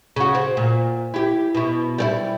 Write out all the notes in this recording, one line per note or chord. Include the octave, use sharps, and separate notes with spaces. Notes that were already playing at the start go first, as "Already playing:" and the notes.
C#3 F#4
C4
A#2
E4 G4
B2 E4
G3 C4 E4